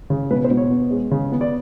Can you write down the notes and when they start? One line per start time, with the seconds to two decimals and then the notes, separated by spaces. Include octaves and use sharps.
0.10 C#3
0.31 B2 B4
0.44 C5
0.51 B2
0.57 C#5
0.71 B3
0.91 G#3
1.11 C#3
1.32 B3
1.41 D5